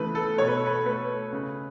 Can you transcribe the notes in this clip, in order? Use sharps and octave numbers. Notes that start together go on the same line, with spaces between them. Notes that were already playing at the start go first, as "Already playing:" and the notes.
Already playing: C#3 E3 A3 B4
A4
B2 C#5
B4
A4
B4
A3 B4
C#3